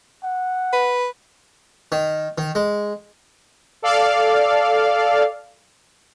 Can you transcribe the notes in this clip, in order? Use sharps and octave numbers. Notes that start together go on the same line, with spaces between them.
F#5
B4
D#3
D#3
G#3
A4 D5 F5